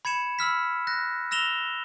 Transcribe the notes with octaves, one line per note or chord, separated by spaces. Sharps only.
B5 G#6 C#7 E7
B5 E6 F6 B6
F#6 A#6
E6 A#6 E7 F7 G7